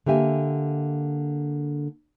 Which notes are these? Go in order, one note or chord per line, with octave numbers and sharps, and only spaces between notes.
D3 A#3 G4 E5 G#5